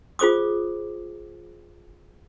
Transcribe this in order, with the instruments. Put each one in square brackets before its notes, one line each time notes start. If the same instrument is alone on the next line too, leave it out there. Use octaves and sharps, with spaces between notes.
[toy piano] F4 G#4 C5 D6 D#6